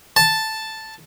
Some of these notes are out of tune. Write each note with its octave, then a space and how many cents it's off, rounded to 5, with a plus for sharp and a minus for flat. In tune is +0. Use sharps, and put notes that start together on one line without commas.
A5 +0